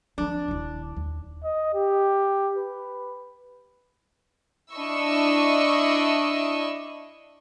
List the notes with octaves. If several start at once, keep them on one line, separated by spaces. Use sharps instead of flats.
F3 C4 D4
D#1 E4
D#2
D#5
G4
B4
D4 E4 D#5 C#6 E6